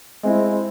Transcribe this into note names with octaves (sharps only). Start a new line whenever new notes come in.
G#3 C4 E4